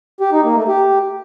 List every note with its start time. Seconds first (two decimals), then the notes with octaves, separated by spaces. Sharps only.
0.20 G4
0.32 D#4
0.44 A#3
0.56 A3
0.68 G4